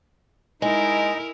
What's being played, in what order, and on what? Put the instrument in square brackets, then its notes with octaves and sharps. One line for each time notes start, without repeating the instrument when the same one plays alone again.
[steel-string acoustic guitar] G#3 [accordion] D#4 A#5 [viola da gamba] E4 A#4